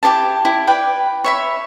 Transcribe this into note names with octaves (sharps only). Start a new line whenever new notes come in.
E4 G4 A#4 A5
E4 G4
B4 D5 G5
C#5 E5 B5